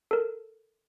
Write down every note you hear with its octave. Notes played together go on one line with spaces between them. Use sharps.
A4 A#4